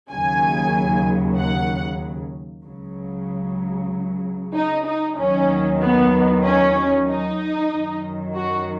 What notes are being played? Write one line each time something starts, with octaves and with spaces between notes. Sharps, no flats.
D#2 C#3 F#3 G#5
F#5
C#2 C#3 F#3
D#4
D#4
D#2 D#3 F#3 C#4
B3
C#4
D#4
F#2 D#3 F#3
F#4